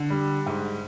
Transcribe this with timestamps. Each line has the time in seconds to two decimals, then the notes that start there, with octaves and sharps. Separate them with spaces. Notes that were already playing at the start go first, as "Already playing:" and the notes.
Already playing: D3
0.10 G3
0.46 G#2